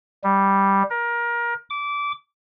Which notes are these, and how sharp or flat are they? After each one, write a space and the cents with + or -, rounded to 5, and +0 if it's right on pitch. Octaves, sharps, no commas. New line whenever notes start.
G3 +0
A#4 +25
D6 -20